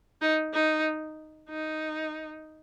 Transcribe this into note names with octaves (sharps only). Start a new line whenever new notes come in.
D#4
D#4
D#4